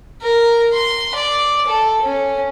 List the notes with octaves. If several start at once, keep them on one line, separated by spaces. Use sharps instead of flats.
A#4
C6
D5
A4
C#4